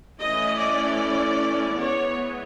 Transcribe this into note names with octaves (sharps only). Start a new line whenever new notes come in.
E3 A3 C#4 E4 D#5
D5
E3 G#3 B3 C#5